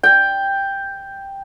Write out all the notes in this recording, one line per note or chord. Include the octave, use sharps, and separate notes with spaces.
G5